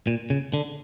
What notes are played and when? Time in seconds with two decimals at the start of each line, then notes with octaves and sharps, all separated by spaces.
0.07 A#2
0.30 C#3
0.54 D3